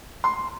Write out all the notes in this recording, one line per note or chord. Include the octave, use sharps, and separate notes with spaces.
C6